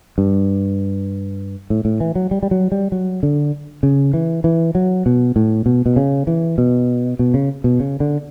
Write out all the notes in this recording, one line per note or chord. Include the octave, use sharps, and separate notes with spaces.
G2
A2
A2
E3
F#3
G3
G3
F#3
G3
F#3
D3
C#3
E3
E3
F#3
B2
A2
B2
B2
C#3
E3
B2
B2
C#3
B2
C#3
D3